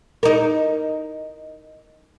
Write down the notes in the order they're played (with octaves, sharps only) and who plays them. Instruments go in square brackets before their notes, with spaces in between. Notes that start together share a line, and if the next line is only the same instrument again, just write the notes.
[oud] D#4 A#4